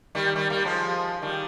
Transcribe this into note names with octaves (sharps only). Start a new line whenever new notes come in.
D#3 G3
D#3 G3
G3 A#3
F3 G#3
D#3 G3